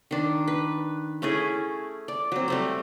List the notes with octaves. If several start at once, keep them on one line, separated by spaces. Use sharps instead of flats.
D#3 D4
B4
A3 C#4 E4 G#4
D5
F#3 C4
G3 A3 C4